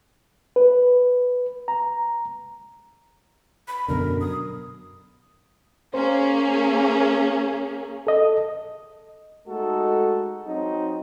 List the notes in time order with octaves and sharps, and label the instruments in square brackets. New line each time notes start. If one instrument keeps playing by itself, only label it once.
[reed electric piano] B4
A#5
[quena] B5
[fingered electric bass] F#2 B2 D3 [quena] A#4
[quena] D#6
[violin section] A#3 C#4 G#4 [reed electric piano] C5
[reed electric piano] A4 D#5
[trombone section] G#3 A3 D#4 F#4 A4
F#3 C4 D#4